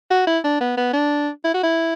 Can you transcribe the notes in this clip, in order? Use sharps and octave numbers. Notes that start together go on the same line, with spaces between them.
F#4
E4
D4
B3
B3
D4
E4
F#4
E4